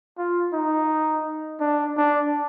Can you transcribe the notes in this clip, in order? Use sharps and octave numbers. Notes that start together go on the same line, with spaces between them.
F4
D#4
D4
D4